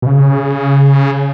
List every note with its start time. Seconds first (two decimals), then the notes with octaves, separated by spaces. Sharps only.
0.02 B2
0.07 C#3